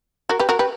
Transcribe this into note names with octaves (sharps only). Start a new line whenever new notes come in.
F#4 A#4
G4 B4
F#4 A#4
G4 B4